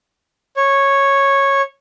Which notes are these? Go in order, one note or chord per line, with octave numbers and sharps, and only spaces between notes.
C#5